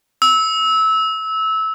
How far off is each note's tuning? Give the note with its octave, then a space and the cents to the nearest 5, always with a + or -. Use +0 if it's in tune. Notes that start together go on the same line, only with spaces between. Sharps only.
E6 -20